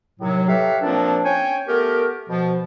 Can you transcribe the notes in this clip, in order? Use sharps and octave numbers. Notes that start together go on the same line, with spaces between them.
D#2 A2 C3 F#3
G4 A4 B4 C#5 E5 F5
A#2 F3 A#3 C4 D4
C#4 C#5 G5 G#5
A3 B3 G4 A#4
B2 F3